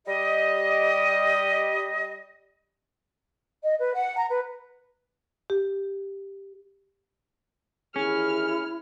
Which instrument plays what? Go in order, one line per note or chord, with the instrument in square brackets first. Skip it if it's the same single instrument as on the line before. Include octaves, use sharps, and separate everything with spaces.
[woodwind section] G3 G4 D#5
[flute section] D#5
B4
F#5
A#5
B4
[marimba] G4
[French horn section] D#2 E3 G#4 [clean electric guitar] C#4 [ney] E4 [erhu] F6